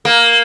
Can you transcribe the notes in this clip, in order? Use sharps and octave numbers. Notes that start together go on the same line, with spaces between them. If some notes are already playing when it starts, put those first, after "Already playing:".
A#3